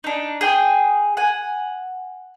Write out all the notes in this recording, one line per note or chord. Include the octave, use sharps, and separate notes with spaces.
D4 D#4
G#4 G5 D#6
F#5 G#5